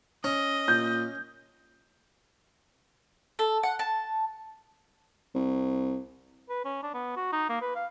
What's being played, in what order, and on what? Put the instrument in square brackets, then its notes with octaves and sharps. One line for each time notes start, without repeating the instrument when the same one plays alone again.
[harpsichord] C#4 [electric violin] D#5
[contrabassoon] A#2 [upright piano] G6
[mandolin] A4
F#5
A5
[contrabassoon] C2
[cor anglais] B4
C#4
D4
B3
F#4
D#4
A#3
B4
F5